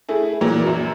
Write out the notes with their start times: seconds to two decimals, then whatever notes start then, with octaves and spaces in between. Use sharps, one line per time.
0.09 A3 E4 G#4
0.41 A#2 E3 F#3
0.66 F#2